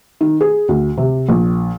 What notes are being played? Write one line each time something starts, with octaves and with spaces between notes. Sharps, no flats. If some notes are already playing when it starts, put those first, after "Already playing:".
D#3
G#4
D2
C3
A#1